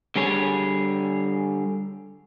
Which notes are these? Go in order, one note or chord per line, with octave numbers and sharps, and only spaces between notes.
D3 G3 G#4 C#5